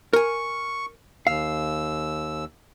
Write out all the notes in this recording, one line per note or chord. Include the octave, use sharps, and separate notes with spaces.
A#4 G#5 C#6
D#2 F5 E6